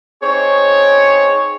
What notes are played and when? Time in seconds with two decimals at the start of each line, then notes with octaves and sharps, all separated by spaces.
0.23 C4 D#4 G#4 C#5